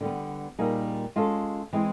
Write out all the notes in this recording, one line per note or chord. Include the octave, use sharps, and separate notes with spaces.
D3 G3 B3
A#2 G3 A#3 D#4 G#4
G#3 C#4 F4 A4
E3 G#3 C4